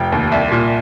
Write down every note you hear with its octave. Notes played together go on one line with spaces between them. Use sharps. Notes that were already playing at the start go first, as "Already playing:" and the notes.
Already playing: F1 G5
D#2
C2
A#2